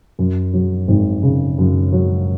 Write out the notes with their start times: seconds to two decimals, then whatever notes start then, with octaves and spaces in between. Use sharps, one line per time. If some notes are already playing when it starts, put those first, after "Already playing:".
0.19 F#2
0.54 F#3
0.88 G#1
1.23 C#3
1.58 F#2
1.92 F#3